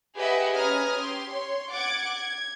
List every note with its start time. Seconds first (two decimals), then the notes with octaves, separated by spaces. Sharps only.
0.16 G4 G#4 B4 D#5 E5 F#5
0.53 C#4 B4 A#5 D#6 F6 G#6
0.97 G4 C6
1.31 C#5 C6
1.72 F#5 D6 G#6 A6 C#7
2.13 G#6